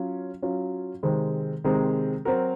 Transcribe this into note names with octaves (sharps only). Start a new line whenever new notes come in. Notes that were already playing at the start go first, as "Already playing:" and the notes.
Already playing: F#3 C#4 F4
F#3 C#4 F4
C3 D#3 G#3 C4
C3 D#3 G#3 C4
F#3 C4 F#4 A#4